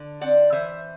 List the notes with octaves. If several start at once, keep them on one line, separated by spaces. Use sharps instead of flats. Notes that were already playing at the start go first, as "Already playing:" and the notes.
Already playing: D3
C4 D5 F#5
E3 C5 E5